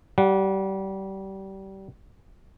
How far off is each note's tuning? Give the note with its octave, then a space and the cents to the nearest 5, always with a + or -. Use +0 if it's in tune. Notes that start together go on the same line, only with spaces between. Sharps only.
G3 -25 F#5 +0